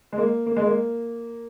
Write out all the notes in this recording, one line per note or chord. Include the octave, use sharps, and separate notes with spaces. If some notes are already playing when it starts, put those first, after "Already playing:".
G#3
A#3
A#3
G#3
A#3